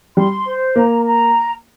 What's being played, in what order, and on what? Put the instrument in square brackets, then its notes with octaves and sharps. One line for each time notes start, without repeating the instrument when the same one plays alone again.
[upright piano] G3 [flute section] C6
[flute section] C5
[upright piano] A#3 [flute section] A#5
[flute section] A#5